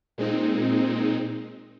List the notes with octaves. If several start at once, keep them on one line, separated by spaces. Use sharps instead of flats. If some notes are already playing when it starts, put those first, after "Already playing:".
A#2 G#3 C4 D#4